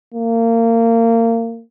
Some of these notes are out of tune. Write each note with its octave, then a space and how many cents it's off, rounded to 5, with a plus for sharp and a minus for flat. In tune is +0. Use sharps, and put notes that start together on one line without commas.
A#3 -25